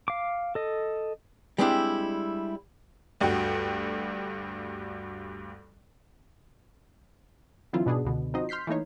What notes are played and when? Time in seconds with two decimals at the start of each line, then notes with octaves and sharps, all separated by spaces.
0.08 F5 D6
0.55 A4 D#5
1.58 G3 G#3 C4 D4 E4 G4
3.20 D2 G2 F#4 G5
7.73 D3 E3 F#3 C4 E4 F4
7.86 G#2 B2 B3 D4 G#4
8.05 C#2 B2 D3
8.34 F3 C4 D#4 F#4 C5 D#5
8.49 C6 F6 G6 B6 C7
8.67 E3 A3 A#3 D#4 C#5